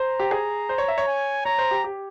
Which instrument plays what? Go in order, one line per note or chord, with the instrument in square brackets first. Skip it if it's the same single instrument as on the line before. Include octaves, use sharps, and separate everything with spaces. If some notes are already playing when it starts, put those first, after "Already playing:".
Already playing: [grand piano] C5 [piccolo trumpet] A#5
[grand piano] G4
G#4
C5
C#5
E5
C#5
[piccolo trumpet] G#5
[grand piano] C#5 [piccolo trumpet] A#5
[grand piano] C5
G4
G4